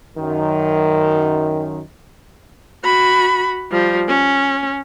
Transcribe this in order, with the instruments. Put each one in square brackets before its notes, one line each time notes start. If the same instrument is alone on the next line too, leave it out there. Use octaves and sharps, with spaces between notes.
[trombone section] F#2 D#3
[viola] F#4 B5
F3 G3
C#4